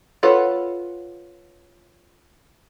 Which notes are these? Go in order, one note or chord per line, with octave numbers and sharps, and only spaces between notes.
F4 A4 B4 C#5 F#5